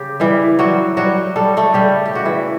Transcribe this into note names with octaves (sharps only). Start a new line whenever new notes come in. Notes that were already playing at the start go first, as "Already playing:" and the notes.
Already playing: C#3 G4
E3 G3 E4
F#3 G3 F#4
F#3 G3 F#4
G3 A4
A3 A4
C#3 G3 G4
G4
C#3 F#4
E3 E4